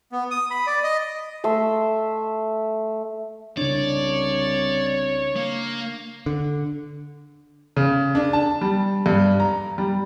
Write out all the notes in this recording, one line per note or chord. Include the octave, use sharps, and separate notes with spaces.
B3
D#6
B5
D5
D#5
A3 E5 C6
C2 C#3 D4 C#5 D5
A#3
D3
C#3
D4
A5
G3
G2
A#5
G3